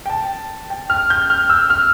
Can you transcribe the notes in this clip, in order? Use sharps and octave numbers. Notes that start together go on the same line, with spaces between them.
G5
A5
G5
F6
G6
F6
E6
F6